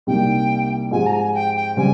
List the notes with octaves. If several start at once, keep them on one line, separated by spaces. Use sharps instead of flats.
C2 C3 G3 A#3 D#4 G5
G#2 F3 C4 G4 G#5
A#5
G#5
G5
G5
C#3 G3 C4 G#5